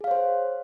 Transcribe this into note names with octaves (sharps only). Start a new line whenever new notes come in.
G#4 C5 C#5 F5